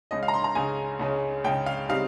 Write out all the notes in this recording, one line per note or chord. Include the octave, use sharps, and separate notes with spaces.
C#2 C#3 G#3 C#4 D#5
F5
A#5
C6
A#5
C#2 C#3 G#3 C#4 G#5
C#2 C#3 G#3 C#4
C#2 C#3 G#3 C#4 G5
F5
C#3 G3 C4 D#4 F5